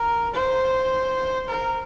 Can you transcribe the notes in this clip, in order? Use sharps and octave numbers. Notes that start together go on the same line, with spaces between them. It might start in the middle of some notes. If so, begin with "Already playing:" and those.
Already playing: A#4
C5
A#4